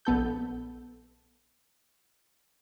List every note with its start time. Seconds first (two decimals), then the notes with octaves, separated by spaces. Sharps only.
0.05 A#1 B3 A4 G6